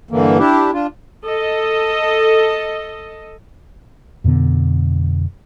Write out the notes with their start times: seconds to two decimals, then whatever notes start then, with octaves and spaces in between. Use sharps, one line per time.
0.11 G2 D3 E3 A#3
0.38 D4 E4 G4
0.73 D4 F4
1.25 A4 D#5
4.24 F2 B2 D3 B3